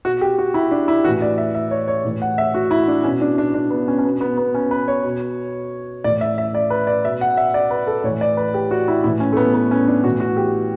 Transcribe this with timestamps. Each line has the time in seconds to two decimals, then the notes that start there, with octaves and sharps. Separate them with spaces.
0.05 B2 F#4
0.21 G4
0.38 F#4
0.54 E4
0.71 D4
0.88 E4
1.04 A2 E3 F#4
1.22 D5
1.38 E5
1.55 E5
1.71 C#5
1.88 C#5
2.04 A2 E3
2.22 F#5
2.38 E5
2.54 F#4
2.71 E4
2.88 D4
3.04 B2 C#4
3.21 D4
3.38 D4
3.54 D4
3.70 B3
3.88 C#4
3.98 C#4
4.04 B2 B3
4.21 B3
4.38 B3
4.55 C#4
4.71 B4
4.88 C#5
5.04 B2
6.04 A2 E3 D5
6.21 E5
6.38 E5
6.55 D5
6.70 B4
6.87 D5
7.05 B2 E5
7.21 F#5
7.37 E5
7.54 D5
7.71 B4
7.87 A4
8.04 A2 C#5
8.09 E3
8.21 D5
8.37 B4
8.54 G4
8.71 F#4
8.88 E4
9.04 A2 E3 E4
9.20 C#4
9.33 A3
9.37 B3
9.54 B3
9.71 C#4
9.88 D4
10.04 A2 E3 F#4
10.20 F#4
10.37 G4